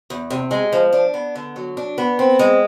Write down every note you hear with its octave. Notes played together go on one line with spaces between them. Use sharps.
E2
C3
G#3
F3
D4
B3
D3
F#3
D4
B3
C4
G#3